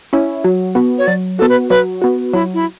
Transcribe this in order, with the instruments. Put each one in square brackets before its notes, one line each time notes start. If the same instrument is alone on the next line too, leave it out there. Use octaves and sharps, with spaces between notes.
[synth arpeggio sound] C#4 E4
F#3
B3 F#4
[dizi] C#5
[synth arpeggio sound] F#3 [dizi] D5
[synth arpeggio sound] B3 F#4 [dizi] A4
[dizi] B4
[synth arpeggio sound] F#3 [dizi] B4
[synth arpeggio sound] B3 F#4
[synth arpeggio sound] F#3 [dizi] E4
[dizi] E4